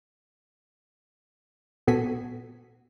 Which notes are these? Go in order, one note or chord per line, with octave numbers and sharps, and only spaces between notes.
A#2 B3 F#4 A4 G#5 B6